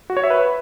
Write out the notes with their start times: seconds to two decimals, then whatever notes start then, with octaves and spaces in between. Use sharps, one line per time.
0.10 F#4
0.17 C#5
0.23 E5
0.30 B4